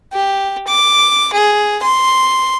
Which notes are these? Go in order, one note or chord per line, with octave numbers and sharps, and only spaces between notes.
G4
D6
G#4
C6